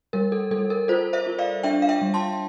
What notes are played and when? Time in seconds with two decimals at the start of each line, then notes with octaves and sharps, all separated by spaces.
0.13 G3 A#4
0.32 A4
0.51 G3 A4
0.70 A#4
0.88 F4 A4 C5
1.13 C5 E5
1.27 F4
1.38 D5 F5
1.63 D4 E5 G5
1.82 F5
1.89 E5 G5
2.02 G3
2.14 A5 C6